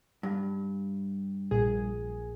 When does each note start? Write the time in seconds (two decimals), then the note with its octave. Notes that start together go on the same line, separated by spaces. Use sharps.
0.23 G2
1.51 A#1 A#2 G#4